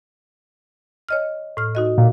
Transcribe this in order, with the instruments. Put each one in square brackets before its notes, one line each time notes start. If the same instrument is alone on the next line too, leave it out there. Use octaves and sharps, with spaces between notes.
[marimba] C#5 D#5 F6
A2 F6
D#4 F#4 D#5
[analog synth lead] A#2